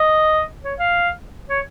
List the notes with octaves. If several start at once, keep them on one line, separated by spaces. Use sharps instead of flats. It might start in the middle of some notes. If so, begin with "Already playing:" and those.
Already playing: D#5
C#5
F5
C#5